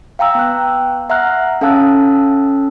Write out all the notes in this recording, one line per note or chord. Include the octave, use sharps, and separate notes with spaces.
F5 G5 A#5 E6
B3 F#6
E5 F#5 A#5 F6 F#6
C#4 A4 F5 A5 E6 F#6